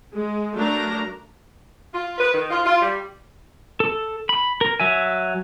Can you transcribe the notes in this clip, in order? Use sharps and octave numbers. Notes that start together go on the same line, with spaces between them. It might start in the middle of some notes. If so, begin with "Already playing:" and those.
G#3
F#3 A3 D4 A#4 A#5
F4
B4
D#3
F4
F4
G3
A4
B5
A#4
F#3 E5 G#5